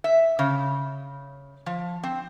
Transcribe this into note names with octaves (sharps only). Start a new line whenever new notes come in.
E5
C#3
F3
C4